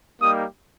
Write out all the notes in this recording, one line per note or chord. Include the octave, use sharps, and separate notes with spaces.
G3 A#3 D#4 G4 D#6